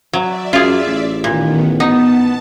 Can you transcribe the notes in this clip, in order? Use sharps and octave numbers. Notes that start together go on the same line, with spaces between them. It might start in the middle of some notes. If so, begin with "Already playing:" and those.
F#3 D5 E5
F#2 F4 G#4
A1
A#2 D#3 B3
B3 D#4 A5